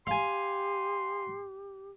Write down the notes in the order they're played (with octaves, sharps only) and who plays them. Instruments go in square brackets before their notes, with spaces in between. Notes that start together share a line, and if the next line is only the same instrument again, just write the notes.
[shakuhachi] G4 [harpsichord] F5 G#5 [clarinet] C6